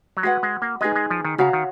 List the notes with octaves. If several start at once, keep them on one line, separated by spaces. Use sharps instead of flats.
F#3
G#3 F#4 B4 F#5
G#3
A#3
G#3 D#4 G#4 B4 D#5
G#3
F3
D#3
C#3 F#4 C#5 F5 A#5
D#3